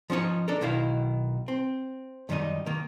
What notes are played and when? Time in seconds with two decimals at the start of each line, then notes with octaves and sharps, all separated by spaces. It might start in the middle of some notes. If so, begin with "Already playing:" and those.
0.10 F3 C#4 D#4 C#5
0.48 D4 A4 A#4
0.61 B1 B2 D#3 E4 E5 F5
1.48 C4
2.29 F#2 D#3 G3 C#4 D#4 D#5
2.66 D#3 A#3